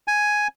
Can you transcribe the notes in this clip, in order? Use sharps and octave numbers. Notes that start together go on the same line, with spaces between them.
G#5